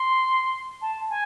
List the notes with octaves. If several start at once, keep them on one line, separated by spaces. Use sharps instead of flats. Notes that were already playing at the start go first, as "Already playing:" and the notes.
Already playing: C6
A5
G#5